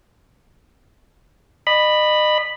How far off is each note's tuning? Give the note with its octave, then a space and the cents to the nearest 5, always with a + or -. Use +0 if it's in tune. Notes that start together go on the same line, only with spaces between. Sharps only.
D#5 -35 B5 +0